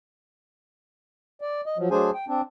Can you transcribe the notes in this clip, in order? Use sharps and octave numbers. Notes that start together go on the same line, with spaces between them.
D5
D#5
F3 F#3
F#3 A3 D4 G#4 C5 G#5
G5
C4 D4